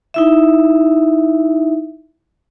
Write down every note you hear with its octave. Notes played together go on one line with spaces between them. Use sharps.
D#4 E4 E5